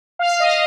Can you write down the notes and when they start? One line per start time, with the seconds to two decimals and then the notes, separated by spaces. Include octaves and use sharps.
0.19 F5
0.40 D#5